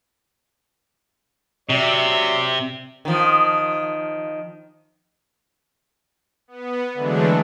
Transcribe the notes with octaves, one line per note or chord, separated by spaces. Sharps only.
C3 F#3 D5 E5
D#3 F3
B3
D3 E3 F#3 G#3 A3 D4